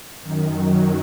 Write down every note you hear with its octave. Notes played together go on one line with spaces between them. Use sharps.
F#2 D#3
F#3